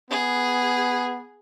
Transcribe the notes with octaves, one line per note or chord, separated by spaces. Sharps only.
B3 G#4